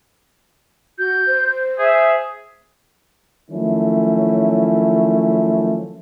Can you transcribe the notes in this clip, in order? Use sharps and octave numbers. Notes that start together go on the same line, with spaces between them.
F#4 G6
C5
G#4 E5
D#3 F3 F#3 A3 C#4 E4